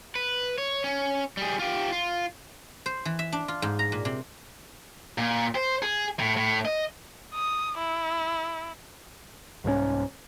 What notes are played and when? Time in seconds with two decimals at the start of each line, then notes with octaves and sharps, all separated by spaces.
0.15 B4
0.58 C#5
0.84 C#4
1.37 G3 G#4
1.59 F4 G4
1.92 F4
2.86 C5
3.05 E3
3.19 E5
3.32 D4
3.48 F4
3.62 G#2
3.79 A#5
3.92 A#2
4.05 C3
5.18 A#2
5.55 C5
5.82 G#4
6.19 A2
6.37 A2
6.65 D#5
7.34 D#6
7.78 E4
9.64 C2 G#2 F3 C#4